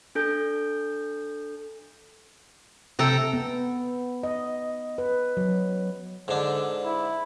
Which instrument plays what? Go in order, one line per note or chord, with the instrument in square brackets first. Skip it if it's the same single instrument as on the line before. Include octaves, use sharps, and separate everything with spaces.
[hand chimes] D4 A4 G6
[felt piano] C3 [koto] A4 G5 A#5
[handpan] B3
D#5
B4
F#3
[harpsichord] G#2 D4 [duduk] D3
[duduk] E4